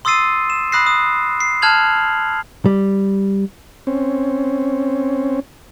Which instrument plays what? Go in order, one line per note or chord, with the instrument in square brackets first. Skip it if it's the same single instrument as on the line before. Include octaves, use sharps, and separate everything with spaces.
[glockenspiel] C6 D#6 E6 A6 C7 D#7
E7
B5 D#6 F#6 A#6 C7
D#6
C7
A5 F6 F#6 G#6 F7 F#7
[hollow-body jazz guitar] G3
[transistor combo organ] C4 C#4